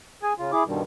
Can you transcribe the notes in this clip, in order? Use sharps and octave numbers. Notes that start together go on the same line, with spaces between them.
G#4 G#5
C#3 F4
E4 G#4 D6
G2 B2 D3 D#3 G3